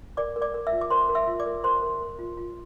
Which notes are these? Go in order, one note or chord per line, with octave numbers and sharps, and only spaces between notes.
A#4 D5 D6
A#4
D5 D6
A#4
E5 E6
F4
D6
A#4 C5 C6
A#4
E5 E6
F4
D5 D6
A#4
A#4 C5 C6
A#4
A#4
F4
F4